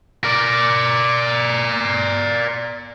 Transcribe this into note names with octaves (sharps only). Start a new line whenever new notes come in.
A#4 D5